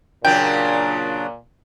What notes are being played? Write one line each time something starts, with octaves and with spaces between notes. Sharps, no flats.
A#2 C#3 F#3 D4 G5